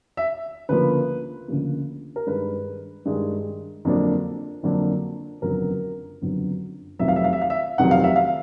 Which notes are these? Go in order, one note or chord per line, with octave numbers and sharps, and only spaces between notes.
E5
D2 C#3 F3 A#3 B4
D2 C#3 F3 A#3
A#4
G2 D#3 G#3 B4
G2 D#3 G#3
F2 D3 F#3 A#3 D4
F2 D3 F#3 A#3 D4
F#1 F2 D3 F#3 B3 A#4
F#1 F2 D3 F#3 B3
F1 F2 C3 D#3 F#3 E5
F5
E5
F5
E5
F5
E5
F1 F2 C3 D#3 F#3 F#5
F5
E5
F5